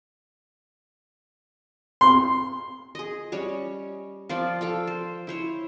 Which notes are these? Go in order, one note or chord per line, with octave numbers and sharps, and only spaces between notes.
C6
G#4 D#5
G3 C#4 C#5
F3 F4 C5 D5
A4 F5 G5
C5
E4 C5 C#5